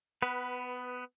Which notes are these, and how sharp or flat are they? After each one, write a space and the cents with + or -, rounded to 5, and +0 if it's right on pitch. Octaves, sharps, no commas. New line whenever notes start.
B3 +15 B4 -5